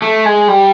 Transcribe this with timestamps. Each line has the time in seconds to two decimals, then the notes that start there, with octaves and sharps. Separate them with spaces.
0.02 A3
0.25 G#3
0.48 G3